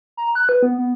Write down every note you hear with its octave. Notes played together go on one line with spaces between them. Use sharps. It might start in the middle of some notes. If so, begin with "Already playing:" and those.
A#5
F#6
B4
B3
B3